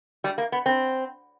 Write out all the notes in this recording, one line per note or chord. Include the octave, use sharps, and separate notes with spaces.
G3
A#3
B3
C4